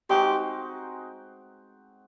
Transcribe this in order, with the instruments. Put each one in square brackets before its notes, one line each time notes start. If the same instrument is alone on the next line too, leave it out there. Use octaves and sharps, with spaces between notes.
[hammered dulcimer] G#3 C4 D#4 F#4 [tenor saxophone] G4